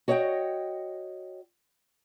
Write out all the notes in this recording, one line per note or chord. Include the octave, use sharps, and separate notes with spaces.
F#4 C#5 D#5 F5 G5